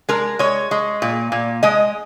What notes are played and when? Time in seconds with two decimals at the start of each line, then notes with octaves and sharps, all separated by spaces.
0.09 G#3 A#4
0.39 G#3 C#5
0.71 G#3
1.02 A#2
1.32 A#2
1.63 G#3 D#5